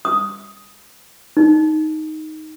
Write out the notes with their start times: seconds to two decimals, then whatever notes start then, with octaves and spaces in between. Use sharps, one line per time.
0.05 D#6
1.37 D#4